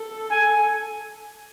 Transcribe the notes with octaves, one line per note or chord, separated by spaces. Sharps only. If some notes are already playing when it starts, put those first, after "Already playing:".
Already playing: A4
G#5